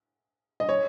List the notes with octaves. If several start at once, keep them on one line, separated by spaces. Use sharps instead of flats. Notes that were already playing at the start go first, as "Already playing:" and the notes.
D#5
C#5